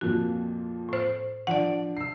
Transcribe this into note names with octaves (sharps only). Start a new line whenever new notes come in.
F2 A#2 F3 F#4
A2 C5
F3 D4 D5 F#5
E6 C7